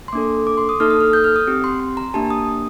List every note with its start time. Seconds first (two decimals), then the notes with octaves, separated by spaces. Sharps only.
0.08 C6
0.13 A#3 D4 A4 D6
0.47 D6
0.57 C6
0.69 D#6
0.80 A#3 D#4 A4 F6
0.90 D#6
1.00 F6
1.13 G6
1.24 F6
1.36 D#6
1.47 C4 G4
1.64 C6
1.80 C6
1.97 A#5
2.14 A#3 D4 G4 A5
2.30 D#6